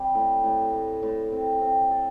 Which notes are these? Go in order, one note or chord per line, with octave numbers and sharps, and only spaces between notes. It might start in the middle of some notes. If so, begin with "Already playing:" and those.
Already playing: G3 C4
A2
A2
A2
A2
C4
C4
A4